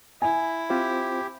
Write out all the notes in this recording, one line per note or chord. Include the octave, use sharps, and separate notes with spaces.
E4 G#5
C4 F4 G4 C5